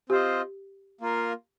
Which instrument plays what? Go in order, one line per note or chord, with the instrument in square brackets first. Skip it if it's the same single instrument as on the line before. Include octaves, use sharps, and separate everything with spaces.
[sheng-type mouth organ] C4 F4 C5 D#5 [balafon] G4
[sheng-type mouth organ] A#3 F4 A#4